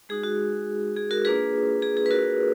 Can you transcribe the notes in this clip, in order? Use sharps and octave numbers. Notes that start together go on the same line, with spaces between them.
G#3 D#4 F#4 G#4
F#4
G#4
F#4 A#4
A#3 D4 F4 G#4 B4
G#4
G#4
B4
F#4 A#4